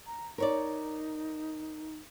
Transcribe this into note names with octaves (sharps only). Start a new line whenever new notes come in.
A#5
D#4 A#4 C#5 D5